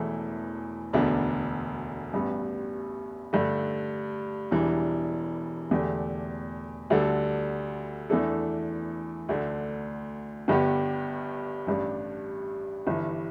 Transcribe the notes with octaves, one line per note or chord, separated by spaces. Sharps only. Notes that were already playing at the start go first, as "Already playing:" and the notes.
Already playing: E1 E2 E3 A3 E4
E1 D2 D3 B3 D4
A1 G2 G3 B3
G2 D3 A3
E1 E2 E3 G3 D4
E1 E2 D3 A3 G4
D2 D3 G3 D4 A4
E2 E3 A3 D4 A4
D2 D3 A3
G1 G2 D3 B3 G4
A1 G2 G3 D4
G1 G2 E3